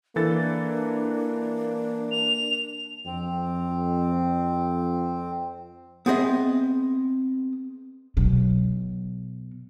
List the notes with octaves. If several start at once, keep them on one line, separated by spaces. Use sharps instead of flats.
E3 A#3 D4 A4 A6
F7
F2 C4
B3 C4 G#4 D#5 E5
B2 F#3